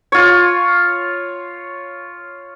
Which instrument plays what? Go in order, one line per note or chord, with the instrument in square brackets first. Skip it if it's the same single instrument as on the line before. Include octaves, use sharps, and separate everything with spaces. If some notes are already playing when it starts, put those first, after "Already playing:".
[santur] F4 C#5